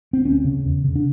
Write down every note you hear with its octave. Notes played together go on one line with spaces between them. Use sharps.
C4
D2 C#4
C#3
E2
C#3
D4